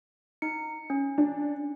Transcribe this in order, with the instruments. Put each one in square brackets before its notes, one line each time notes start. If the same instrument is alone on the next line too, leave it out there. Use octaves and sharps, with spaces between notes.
[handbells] D#4 C#7
C#4
[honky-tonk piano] D4